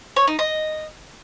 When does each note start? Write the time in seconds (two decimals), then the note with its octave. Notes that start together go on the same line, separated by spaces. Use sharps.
0.16 C#5
0.28 D#4
0.39 D#5